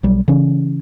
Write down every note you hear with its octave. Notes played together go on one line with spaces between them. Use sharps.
B1 F#3 G3
C#3 E3 C#4